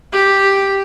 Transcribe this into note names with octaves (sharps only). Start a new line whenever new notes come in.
G4